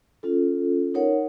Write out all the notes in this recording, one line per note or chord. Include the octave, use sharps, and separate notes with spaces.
C#4 F4 A4
D#4 A#4 C#5 F#5